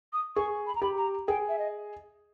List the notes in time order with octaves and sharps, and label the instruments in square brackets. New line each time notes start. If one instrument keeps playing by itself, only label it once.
[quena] D#6
[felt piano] G#4 [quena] C#6
[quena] B5
A#5
[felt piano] G4 [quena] B5
[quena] A#5
[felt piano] G#4 [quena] G5
[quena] E5
D#5